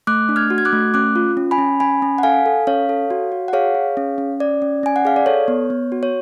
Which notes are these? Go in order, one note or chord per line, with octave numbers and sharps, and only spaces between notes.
A3 D6 F#6
D4
F6 G#6
F#4
G#6
D6 F#6
A3
C#4 D6 F#6
F4
C#4
G#5 B5
C#4
C#4 G#5 B5
C#4
F#5
A4 F5 G#5
A4
C#4 C#5 F5
A4
F#4
F#4
F#5
G#4 C#5 F5
G#4
C#4
C#4
C#4 D5
C#4
C#4 G#5
F#5
G#4 F5
D5
A4 C#5
B3
B3
F#4
C#5